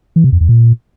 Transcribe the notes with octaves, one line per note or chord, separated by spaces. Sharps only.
E3
C3
F2
E2
A#2